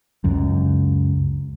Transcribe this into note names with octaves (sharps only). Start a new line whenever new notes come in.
C#2 F#2